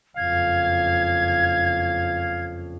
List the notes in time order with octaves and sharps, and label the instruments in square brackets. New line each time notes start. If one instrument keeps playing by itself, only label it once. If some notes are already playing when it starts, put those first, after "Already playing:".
[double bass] F#1 F2 [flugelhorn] F5 [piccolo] G#6